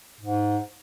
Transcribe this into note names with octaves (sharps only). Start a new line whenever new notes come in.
G#2